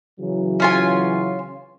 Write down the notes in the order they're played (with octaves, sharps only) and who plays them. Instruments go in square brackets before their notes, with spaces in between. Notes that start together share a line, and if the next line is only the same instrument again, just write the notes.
[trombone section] C#3 E3 F#3
[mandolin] C#4 F4 G#5